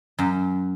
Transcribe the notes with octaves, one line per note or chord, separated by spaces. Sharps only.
F#2